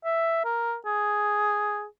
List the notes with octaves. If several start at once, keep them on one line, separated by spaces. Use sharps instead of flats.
E5
A#4
G#4